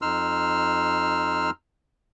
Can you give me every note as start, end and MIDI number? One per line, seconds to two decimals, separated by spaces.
0.02 1.50 41
0.02 1.50 63
0.02 1.50 84
0.02 1.50 88
0.02 1.50 89